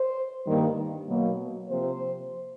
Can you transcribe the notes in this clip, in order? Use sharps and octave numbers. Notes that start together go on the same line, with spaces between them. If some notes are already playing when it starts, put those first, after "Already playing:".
Already playing: C5
G2 D#3 G3 A#3
B2 F#3 A#3
C3 F3 A#3 C5